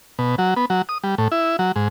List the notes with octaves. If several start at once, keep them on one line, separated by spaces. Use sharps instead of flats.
B2
F#3
B3
F#3
D#6
G3
A2
E4
F#3
G#2